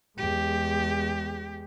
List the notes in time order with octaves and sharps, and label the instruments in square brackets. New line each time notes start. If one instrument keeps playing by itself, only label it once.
[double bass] E2 G#3 [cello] G4